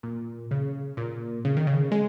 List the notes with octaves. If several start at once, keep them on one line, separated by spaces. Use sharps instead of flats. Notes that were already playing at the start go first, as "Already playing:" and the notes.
A#2
C#3
A#2
C#3
D#3
C#3
G#3